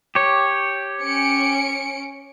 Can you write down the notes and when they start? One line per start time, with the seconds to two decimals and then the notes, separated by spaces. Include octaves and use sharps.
0.15 G4 C#5
1.01 C#4 C#7 D7